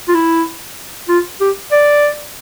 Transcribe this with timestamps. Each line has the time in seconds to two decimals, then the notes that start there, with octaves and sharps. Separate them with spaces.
0.08 F4
0.14 E4
1.09 F4
1.41 G4
1.72 D5